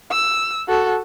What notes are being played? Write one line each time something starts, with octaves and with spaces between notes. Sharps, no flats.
E6
F#4 A4